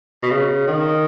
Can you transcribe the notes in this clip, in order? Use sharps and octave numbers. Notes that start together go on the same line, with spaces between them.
B2
C#3
D#3